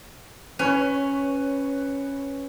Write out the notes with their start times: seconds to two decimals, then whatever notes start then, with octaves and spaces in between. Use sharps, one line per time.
0.59 C#4 B4 C#5